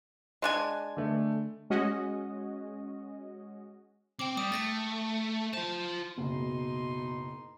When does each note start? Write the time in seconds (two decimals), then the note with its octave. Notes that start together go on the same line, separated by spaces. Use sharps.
0.42 G#3 D4 G#5
0.97 D3 A3
1.70 G#3 C#4 F#4 D#5
4.19 C4 G5 D6
4.37 G3 D#6
4.52 A3 A6 A#6 C#7
5.53 F4 C5 A5
6.18 F#1 B2 D#4 C6